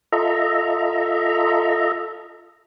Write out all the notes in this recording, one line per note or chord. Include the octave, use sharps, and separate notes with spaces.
F4 A4 D#5 E5 A#5